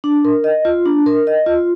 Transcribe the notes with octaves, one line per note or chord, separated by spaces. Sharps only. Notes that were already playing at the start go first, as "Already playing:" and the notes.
D4
A#4
D#5
F4
D4
A#4
D#5
F4